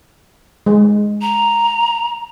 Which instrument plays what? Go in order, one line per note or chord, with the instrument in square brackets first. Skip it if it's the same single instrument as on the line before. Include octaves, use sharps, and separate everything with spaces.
[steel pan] G#3
[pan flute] A#5